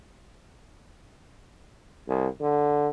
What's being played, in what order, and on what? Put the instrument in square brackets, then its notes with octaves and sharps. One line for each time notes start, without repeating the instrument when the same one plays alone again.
[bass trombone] C2
D3